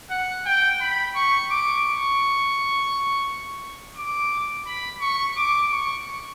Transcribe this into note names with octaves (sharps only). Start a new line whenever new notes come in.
F#5
G5
B5
C#6
D6
C#6
D6
B5
C#6
D6
C#6